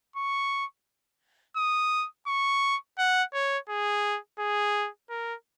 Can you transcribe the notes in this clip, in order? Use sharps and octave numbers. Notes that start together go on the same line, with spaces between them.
C#6
D#6
C#6
F#5
C#5
G#4
G#4
A#4